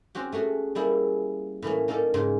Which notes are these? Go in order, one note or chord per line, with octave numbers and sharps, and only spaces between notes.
C4 C#4 F#4 G4
A3 C#4 F#4 G#4
G3 A#3 E4 G#4
A2 E3 A#3 C#4
A#3 C#4 D#4 A4 D5
G#2 C#3 G#3